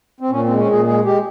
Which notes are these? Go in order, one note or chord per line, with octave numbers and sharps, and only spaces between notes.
C4
A#2 C#4
G#3 C4
C#4
A#2 G#4
G#3 G#4
G#3 G4